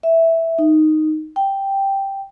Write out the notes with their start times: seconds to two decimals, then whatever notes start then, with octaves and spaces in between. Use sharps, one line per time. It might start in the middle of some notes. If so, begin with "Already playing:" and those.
0.03 E5
0.59 D#4
1.36 G5